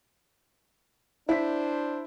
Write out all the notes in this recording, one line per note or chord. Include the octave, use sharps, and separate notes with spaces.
D4 E4 C5 B6